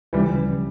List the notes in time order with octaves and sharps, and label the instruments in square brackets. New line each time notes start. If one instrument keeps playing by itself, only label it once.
[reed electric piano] D2 C#3 F3 C#4 [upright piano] E3 G3